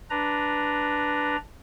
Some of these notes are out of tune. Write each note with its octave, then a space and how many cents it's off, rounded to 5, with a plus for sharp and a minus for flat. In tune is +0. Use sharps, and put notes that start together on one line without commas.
D4 +0 B4 +0 A#5 +0